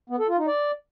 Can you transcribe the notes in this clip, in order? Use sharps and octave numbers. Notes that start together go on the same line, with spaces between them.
B3
A4
F4
D#4
D5